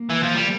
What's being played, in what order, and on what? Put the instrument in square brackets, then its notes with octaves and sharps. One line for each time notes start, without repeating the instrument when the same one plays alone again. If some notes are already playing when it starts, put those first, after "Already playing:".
Already playing: [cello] A#3
[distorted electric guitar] E3
F3
G3